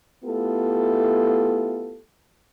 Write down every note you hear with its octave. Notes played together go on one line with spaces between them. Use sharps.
A3 B3 E4 F4 G4 A4